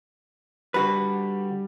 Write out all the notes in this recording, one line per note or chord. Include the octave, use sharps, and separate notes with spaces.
D3 G3 F#4 B4